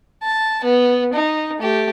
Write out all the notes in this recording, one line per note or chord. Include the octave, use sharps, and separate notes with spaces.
A5
B3
D#4
A3 G4